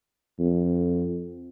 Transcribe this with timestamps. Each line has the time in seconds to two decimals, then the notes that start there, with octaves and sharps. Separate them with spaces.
0.39 F2